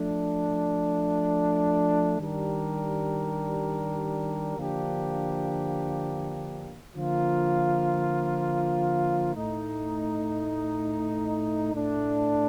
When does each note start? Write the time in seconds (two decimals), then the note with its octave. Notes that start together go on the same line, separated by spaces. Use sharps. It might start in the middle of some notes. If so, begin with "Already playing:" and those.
Already playing: F3 A3 D4
2.20 D#3 G3 D4 G4 A#4
4.58 D3 F3 A#3 D4 G4
6.96 D3 F3 A#3 F4
9.35 A2 A3 D#4
11.73 A2 A3 D4